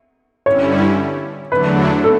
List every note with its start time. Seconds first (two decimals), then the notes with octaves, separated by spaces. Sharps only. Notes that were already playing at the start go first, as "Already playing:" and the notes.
0.46 G2 D3 G3 C#4 E4 C#5
1.51 E2 D3 F#3 A3 D4 B4
2.04 A4